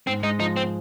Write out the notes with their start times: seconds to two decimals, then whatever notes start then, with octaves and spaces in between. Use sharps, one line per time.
0.07 G#2 C4
0.23 G#3 D#4
0.39 F3 D#4
0.57 C4